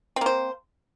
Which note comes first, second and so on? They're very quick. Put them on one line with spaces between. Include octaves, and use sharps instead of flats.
C4 A#3 C5